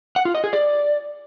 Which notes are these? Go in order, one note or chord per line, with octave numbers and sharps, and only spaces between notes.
F#5
F4
D#5
G#4
D5